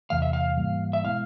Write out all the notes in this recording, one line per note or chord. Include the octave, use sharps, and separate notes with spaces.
E2 C3 E3 A3 F5
E5
F5
G#2 E3 G3 A#3
E5
B2 G#3 B3 E4 F5